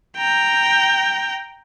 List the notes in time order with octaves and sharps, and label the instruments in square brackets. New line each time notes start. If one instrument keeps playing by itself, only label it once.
[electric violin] G5 A#5